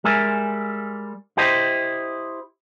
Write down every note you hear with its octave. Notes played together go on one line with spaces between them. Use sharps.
G3 G#3 A#4 E5 G#5
E4 G4 C5 D#5